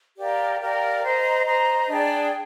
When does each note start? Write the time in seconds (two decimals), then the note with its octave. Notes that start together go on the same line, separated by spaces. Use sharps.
0.19 G4 A#4 D5 F5
0.61 G4 A#4 D5 F5
1.03 C5 D#5 A#5
1.45 C5 D#5 A#5
1.88 D4 G#4 D5 G5